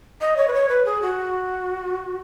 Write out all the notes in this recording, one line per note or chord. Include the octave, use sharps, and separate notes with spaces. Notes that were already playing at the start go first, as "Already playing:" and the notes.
D#5
C#5
B4
C#5
B4
G#4
F#4